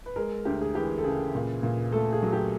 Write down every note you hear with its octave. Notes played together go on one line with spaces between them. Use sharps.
B4
G#3 A#4
D2 G4
G#4
E3 G4
A4
C#3 G#4
A#2
A#2
A3 A4
G#4
F#3
G4